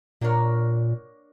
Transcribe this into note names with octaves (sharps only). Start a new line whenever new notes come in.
A#2 A#3 D4 F#4 A#4 C#5